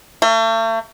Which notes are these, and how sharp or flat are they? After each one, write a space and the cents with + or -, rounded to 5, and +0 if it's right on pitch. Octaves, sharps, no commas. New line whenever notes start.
A3 +40